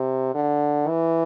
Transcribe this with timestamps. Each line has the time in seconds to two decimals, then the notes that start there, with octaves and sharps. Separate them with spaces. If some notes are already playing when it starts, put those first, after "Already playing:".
Already playing: C3
0.35 D3
0.88 E3